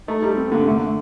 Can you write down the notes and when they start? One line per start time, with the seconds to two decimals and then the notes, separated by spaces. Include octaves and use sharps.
0.08 A3 D#4
0.22 G3 D#4
0.36 C4
0.46 C4
0.51 D3 A#3
0.59 C3
0.66 D3 A3
0.75 A#3
0.86 A3